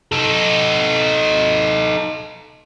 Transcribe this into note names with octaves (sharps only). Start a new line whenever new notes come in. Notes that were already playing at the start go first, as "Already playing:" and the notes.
D#4 A4